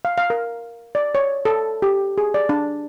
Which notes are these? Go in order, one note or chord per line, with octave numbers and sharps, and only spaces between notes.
F5
F5
A#4
D5
C#5
A4
G4
G#4
D5
D4